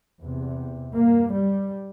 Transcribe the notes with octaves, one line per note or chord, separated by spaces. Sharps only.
E2 C3
G2 A#3
G3